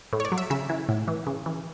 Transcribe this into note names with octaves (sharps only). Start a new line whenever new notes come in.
A2
C#5
D5
F#3
E5
C#3 E5
E3
A2
E3
C#3
E3